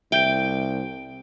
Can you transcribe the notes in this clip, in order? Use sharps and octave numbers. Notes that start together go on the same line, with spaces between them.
C2 E5 G5 G6 D7